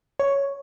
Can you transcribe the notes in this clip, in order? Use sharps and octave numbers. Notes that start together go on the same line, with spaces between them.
C#5